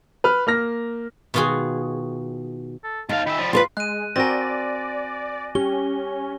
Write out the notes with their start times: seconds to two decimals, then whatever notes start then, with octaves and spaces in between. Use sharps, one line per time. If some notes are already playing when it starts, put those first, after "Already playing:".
0.24 B4 F6
0.47 A#3 F6 A#6
1.34 B2 D#3 F4 F#4 G#4
2.84 A4
3.09 D#2 D#4 F5 A5
3.26 D#3 E5 B5
3.39 F3 G3
3.53 F4 A#4 B4 C6
3.77 G#3 F#6 D#7
4.16 C4 F#4 A#4 D5 G#5 A#6
5.55 C#4 G4 G7